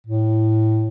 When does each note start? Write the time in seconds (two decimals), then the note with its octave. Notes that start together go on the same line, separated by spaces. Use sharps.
0.06 A2